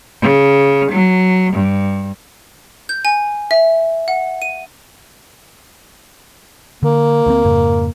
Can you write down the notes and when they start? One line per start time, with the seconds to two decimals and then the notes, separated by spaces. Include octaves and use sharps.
0.22 C#3
0.92 F#3
1.53 G2
2.89 G6
3.05 G#5
3.51 E5
4.08 F#5
4.42 D#7
6.83 D3 A#3
7.26 D2 A3 C4
7.45 F2 G#2 C#3